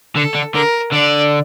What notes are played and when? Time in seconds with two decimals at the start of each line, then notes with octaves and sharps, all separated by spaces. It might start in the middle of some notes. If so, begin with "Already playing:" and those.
0.16 D3 A4
0.35 D3
0.54 D3 A#4
0.92 D3 D5